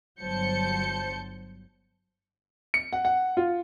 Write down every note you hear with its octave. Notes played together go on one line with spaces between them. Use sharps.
G1 F#3 C5 A5 G6 C#7
C#7
F#5
F#5
F4